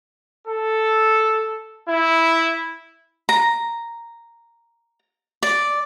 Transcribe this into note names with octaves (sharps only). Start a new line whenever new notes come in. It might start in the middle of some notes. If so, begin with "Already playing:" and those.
A4
E4
A#5
D5